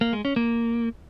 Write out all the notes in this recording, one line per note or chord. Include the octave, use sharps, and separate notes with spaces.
A#3
G#3
C#4
A#3